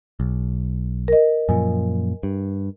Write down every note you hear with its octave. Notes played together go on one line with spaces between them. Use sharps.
B1
A#4 D#5
F#2 A#2 F3 G#5
G2